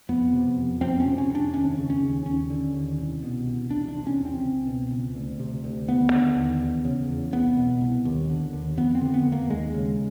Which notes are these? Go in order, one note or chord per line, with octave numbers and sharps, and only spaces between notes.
F2 B3
C3
F2
F2 C4
C#4
C3
C#4
F2
D4
D#2 C#4
C#3
C#4
D#2
D#2 C#4
D3
D#2
C2
B2
C2
E2 D4
D4
C3
C#4
E2
C4
C#2
B2
C#2
D2
C3
D2
D#2 B3
D3
D#2
E2
C#3
E2
C2 B3
B2
C2
D#2
D3
D#2
F2 B3
C4
D3
B3
F2
A#3
D#2 G#3
C#3